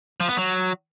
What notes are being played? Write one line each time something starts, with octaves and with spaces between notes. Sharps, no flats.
F3
B3
F#3